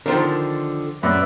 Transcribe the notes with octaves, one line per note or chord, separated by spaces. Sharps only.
D3 D#3 F3 A#4 C5
F#2 B4 D5 E5